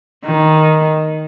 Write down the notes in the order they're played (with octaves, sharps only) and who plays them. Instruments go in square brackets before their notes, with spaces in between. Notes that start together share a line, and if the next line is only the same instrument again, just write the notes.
[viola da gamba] D#3